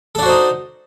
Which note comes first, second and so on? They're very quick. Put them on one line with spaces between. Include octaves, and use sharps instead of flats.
A4 D4 F#4 C5 D#4